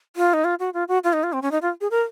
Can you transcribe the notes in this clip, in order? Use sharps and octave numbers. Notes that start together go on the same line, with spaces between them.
F4
D#4
F4
F#4
F4
F#4
F4
D#4
F4
C4
C#4
D#4
F4
G#4
A#4